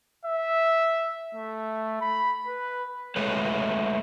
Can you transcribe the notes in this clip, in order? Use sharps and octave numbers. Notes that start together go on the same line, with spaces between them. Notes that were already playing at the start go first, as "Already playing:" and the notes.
E5
A3
B5
B4
G#3 A3 B4 C#5